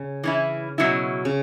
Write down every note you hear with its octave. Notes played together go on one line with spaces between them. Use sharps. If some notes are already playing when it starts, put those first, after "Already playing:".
Already playing: C#3
E3 C#4 E4
B2 F#3 C#4 E4
C#3